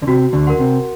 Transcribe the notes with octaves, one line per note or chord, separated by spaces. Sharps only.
D3
C3 F#4
D2 D3
A#4 F#5 C6
C3